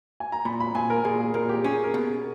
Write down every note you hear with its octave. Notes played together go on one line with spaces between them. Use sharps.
G#5
A#5
A#2 B5
B5
A#2 G#5
A#4
A#2 G#4
G#4
A#2 A#4
G4
C#4 G#4
A#4
B2